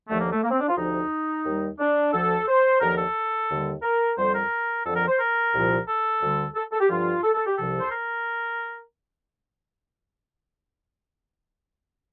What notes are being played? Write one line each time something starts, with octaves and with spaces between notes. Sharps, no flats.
D#2 D3 F3 A3
A#3
A3
A#3
C4
D4
F4
D2 C3 F3 D#4
D#2 D#3 G3
D4
D2 D3 F3 A4
C5
D#2 D3 F3 A#4
A4
D#2 D3 G3
A#4
F2 D3 G3 C5
A#4
F2 D3 F3 A4
A#4
C5
A#4
C2 A#2 F3
A4
D2 D3 G3
A4
A4
G4
G2 D3 F3 F4
A4
A4
G4
C2 C3 F3 A4
C5
A#4